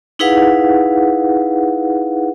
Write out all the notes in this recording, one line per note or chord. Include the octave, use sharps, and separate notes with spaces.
D#4 E4 G#4 B4 F5 F#5